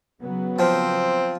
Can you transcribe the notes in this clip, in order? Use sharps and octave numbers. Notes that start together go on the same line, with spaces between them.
C#3 F#3 B3
F3 C4